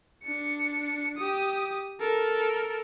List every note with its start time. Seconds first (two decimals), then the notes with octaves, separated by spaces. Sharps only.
0.24 D4 C#7
1.17 G4 D#6
2.00 A4 A#4